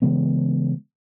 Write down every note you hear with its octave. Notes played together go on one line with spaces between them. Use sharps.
C#3 E3 G#3 B3